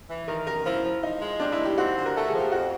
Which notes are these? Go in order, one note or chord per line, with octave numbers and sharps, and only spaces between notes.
E3
D#3 A#4
F#2 A#4
F3 E4
F3
F3 D#4
G#3
G3 D4
E4
D#2
G4
C4 F#4
D3
A#4
A3 A4
G#4
F3
G4
F2 F#4